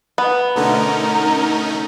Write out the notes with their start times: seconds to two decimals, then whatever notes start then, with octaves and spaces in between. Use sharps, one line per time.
0.18 B3
0.56 B2 D3 A3 C#4 D#4 A#4